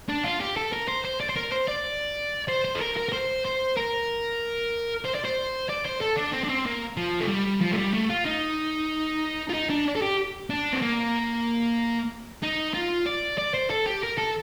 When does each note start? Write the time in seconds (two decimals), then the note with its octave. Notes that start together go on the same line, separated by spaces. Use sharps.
0.09 D4
0.24 F4
0.40 G4
0.57 A4
0.72 A#4
0.88 C5
1.04 C5
1.20 D5
1.29 C5
1.36 A#4
1.52 C5
1.68 D5
2.49 C5
2.65 C5
2.75 A4
2.81 A#4
2.97 A#4
3.09 A#4
3.13 C5
3.45 C5
3.77 A#4
5.05 C5
5.15 D5
5.25 C5
5.69 D5
5.85 C5
6.01 A4
6.17 D4
6.33 C4
6.44 D4
6.49 C4
6.66 A#3
6.97 F3
7.21 A3
7.29 G3
7.61 F3
7.72 A3
7.77 G3
7.94 A3
8.10 F4
8.25 D#4
9.49 F4
9.54 D#4
9.70 D4
9.96 A4
10.02 G4
10.50 D4
10.73 C4
10.82 A#3
12.42 D#4
12.74 F4
13.06 D5
13.38 D5
13.54 C5
13.70 A4
13.86 G4
14.03 A#4
14.18 A4